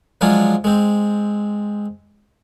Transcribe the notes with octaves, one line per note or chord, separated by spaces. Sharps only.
F3 F#3 G#3 D4 F4 G#4
G#3 C4